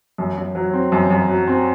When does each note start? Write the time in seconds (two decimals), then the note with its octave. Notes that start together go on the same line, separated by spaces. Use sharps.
0.18 F#2
0.37 F#2
0.55 F#3
0.73 C4
0.92 F#2
1.10 F#2
1.29 F#3
1.48 C4